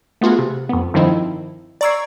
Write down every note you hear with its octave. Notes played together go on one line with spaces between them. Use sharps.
A3 B3 F4 F#4 G#4
C3
F2 B3
G2 D#3 F3 C4 D#4 E4
D5 A#5 C#6 E6 G#6 C7